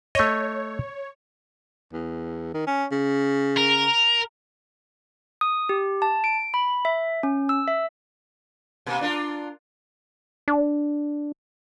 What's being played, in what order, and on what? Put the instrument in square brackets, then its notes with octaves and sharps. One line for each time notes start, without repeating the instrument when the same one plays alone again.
[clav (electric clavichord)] A3 D#5 [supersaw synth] C#5
[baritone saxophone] E2
D#3
C#4
C#3
[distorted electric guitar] A#4
[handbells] D#6
G4
A5
D7
B5
E5
C#4
E6
E5
[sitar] B2 A#3
D4 F4 A#4
[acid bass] D4